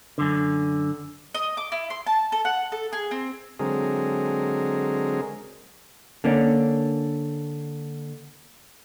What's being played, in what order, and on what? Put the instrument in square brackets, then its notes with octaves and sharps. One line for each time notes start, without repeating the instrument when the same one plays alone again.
[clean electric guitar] F#2 D3
[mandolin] D#5
D6
E4
C6
A5
A4
F#5
A4
G#4
C4
[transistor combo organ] D3 F#3 G#3 C4 G#4 A#4
[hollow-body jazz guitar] D3 A#3 C#4 D4